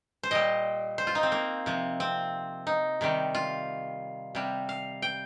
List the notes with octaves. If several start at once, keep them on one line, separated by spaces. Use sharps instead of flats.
C5
A#2 G3 D#5
C5
F4
D#4
C4
A#3
C3 F3
C4
D#4
C3 D#3 G3
F4
C3 G3
F5
G5